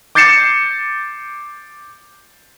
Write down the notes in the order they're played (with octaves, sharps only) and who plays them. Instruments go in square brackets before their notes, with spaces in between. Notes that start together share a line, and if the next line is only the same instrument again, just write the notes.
[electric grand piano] D6 G6 A6 C7 C#7 E7